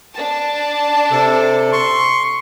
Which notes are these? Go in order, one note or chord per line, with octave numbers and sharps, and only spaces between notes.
D4 A5
C3 A4
C6 C#6